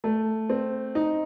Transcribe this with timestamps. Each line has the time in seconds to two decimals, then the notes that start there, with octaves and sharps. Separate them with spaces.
0.04 A3
0.50 C4
0.95 D#4